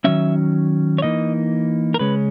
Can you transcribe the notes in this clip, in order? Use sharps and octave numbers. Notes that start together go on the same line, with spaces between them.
D#3 F#3 C#4 E5
C#5
E3 A#3 D#4 D#5
A#4
C#3 G#3 C#4 B4